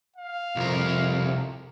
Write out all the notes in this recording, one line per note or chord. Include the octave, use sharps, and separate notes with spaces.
F5
C2 F2 A#4